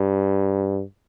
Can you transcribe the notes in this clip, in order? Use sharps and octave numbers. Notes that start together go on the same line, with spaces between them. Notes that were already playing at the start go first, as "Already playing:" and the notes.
Already playing: G2